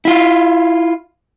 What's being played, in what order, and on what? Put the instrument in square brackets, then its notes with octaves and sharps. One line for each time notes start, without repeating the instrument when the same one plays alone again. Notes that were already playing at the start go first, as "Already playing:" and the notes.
[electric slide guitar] E4 F4